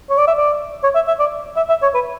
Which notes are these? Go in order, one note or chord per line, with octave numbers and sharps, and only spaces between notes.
C#5
D5
E5
D5
C#5
E5
E5
D5
E5
E5
C#5
B4